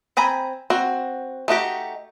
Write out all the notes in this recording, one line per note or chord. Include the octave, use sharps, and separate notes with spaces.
C4 G#5 A#5 B5
C4 F#4
A3 D#4 F#4 G4